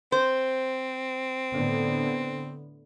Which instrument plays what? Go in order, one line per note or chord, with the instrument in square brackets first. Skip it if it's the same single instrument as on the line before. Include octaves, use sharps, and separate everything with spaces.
[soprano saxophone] C4 [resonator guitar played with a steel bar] C5
[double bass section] A2 D3 B3